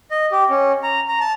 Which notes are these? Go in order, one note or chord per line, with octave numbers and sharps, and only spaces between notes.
D#5
G4
C#4
A#5
A#5
A5